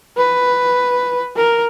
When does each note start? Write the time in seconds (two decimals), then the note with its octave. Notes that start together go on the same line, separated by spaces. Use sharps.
0.17 B4
1.36 A#4